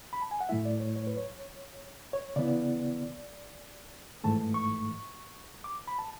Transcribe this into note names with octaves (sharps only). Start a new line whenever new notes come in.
B5
A5
G#5
F#5
A2 F#3 A3 E4 E5
D5
C#5
C#5
B4
C#5
C#5
C#3 E3 B3 E4 D5
G#2 E3 A3 A5
C#6
D6
B5
A5